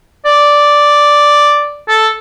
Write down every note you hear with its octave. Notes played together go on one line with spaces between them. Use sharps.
D5
A4